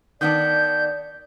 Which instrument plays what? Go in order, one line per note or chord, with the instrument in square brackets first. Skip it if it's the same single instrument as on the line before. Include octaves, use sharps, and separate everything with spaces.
[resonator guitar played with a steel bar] D#3 B3 D4 [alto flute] D5 [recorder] G6